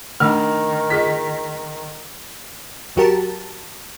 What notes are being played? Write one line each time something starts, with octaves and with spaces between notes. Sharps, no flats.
D#3 A3 D4 D#4 F6
F4 G#4 D#5 B6
D#2 F#3 F#4 G4 A#4 A5